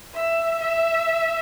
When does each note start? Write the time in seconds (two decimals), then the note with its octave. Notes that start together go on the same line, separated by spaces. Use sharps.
0.14 E5
0.61 E5